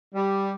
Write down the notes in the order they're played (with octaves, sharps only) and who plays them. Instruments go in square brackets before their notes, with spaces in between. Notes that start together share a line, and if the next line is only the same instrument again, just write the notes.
[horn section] G3